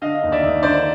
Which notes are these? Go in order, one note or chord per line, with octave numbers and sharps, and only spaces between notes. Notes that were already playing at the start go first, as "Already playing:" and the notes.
D3 D#5 F5
D#2
D5 E5
D#2
D3 C5 D5